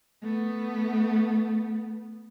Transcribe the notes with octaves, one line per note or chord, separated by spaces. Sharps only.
A3 B3